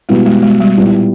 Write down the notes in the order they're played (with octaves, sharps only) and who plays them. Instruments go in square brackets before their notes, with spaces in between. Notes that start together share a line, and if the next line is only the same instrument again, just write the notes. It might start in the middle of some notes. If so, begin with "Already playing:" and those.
[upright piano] B2 G3 B3 E4 [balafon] G#3
[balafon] G#3
G#3
G3
[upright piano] A#2 G3 B3 E4